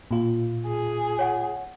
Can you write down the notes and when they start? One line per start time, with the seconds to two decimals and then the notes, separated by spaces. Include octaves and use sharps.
0.11 A#2 F4
0.67 G#4
1.19 C#5 F#5 G#5